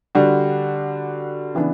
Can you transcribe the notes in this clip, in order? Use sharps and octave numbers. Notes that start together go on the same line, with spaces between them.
D3 G3 D4 F#4
C#3 E3 B3 D4